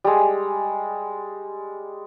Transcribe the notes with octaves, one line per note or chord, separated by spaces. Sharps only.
G3 G#3